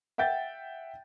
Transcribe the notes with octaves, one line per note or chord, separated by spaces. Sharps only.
E5 F#5 G5 G6 A6